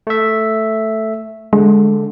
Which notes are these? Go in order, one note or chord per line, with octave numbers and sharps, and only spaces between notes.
A3 E5
D3 G#3